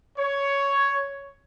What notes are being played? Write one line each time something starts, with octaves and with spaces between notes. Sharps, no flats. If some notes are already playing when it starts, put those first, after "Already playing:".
C#5